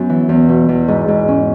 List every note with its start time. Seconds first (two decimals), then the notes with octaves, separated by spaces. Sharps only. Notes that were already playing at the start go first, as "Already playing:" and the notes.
Already playing: F#2 B3
0.09 E3
0.29 E2
0.49 B2
0.69 E2
0.88 G#2
1.08 G#2
1.28 C#4